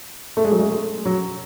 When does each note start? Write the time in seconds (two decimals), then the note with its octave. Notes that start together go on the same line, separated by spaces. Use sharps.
0.37 A3
0.45 G#3
0.52 F#3
0.59 G#3
0.71 A3
1.05 F#3